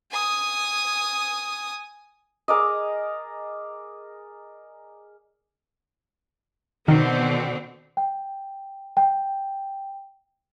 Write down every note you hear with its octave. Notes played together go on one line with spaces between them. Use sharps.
G#5 D#6
G#4 A#4 D5 D#5
B2 D3 D#3 C4
G5
G5